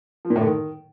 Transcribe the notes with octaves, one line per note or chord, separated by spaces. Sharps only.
F3
A#2
A2
D3
D#3